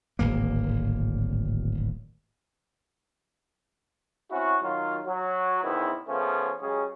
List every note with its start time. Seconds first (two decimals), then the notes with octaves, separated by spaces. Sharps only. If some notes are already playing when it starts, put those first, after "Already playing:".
0.19 D1 G#1 A#3
4.31 C4 C#4 E4 F#4
4.63 D#3 F#3 F4
5.06 F#3
5.63 E2 C3 D#3 B3 C#4 E4
6.08 C#3 F3 A3 B3 C#4
6.61 C#3 F#3 G#3 C#4 G4 G#4